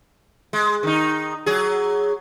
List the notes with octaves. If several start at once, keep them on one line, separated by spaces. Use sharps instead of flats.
G#3
D#3 D#4
F#3 G#4